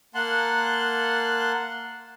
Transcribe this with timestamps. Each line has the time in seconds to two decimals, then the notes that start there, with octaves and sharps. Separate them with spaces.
0.15 A#3 F#5 A5 C6 F#6